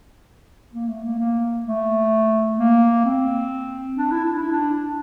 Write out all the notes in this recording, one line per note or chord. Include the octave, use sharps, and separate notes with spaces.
A#3
A3
A#3
A#3
A3
A#3
C4
D4
E4
D4
E4
D4